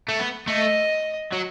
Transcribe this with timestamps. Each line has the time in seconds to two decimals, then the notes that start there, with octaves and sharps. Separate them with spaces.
0.09 A3
0.19 B3
0.47 A3 D#5
1.33 F#3